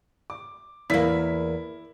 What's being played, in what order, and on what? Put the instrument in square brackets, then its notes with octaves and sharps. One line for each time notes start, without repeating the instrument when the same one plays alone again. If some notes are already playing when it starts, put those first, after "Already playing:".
[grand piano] D6
[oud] E2 A#3 [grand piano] E4 B6